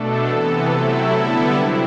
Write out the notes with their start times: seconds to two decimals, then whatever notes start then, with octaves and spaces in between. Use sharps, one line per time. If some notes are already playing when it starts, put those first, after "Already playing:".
Already playing: B2 A3 D4 A4
0.26 C3 E3 B3 A4
0.69 C3 F#3 A3 E4
1.11 D3 G3 B3 E4 A4
1.55 C3 F#3 C4 E4